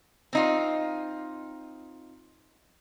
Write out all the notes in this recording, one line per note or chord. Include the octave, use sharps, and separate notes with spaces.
C4 D#4 F4